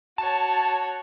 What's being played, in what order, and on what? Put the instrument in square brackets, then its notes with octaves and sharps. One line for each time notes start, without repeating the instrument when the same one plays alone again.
[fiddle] F#4 C#5 [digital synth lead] A5